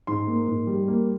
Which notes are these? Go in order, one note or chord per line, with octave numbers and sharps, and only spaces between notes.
G#2 C6
A#3
G#2
G3
A#3